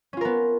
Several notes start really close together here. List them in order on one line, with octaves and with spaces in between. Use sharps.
C#4 F4 A#4 B3